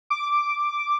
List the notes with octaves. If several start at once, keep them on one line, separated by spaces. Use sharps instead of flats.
D6